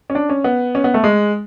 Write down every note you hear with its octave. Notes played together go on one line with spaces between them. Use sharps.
C#4
D4
C#4
B3
C#4
B3
A3
G#3